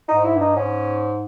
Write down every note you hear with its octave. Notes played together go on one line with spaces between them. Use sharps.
G#2 D#4
E4
G2
D#4
G#2 C#4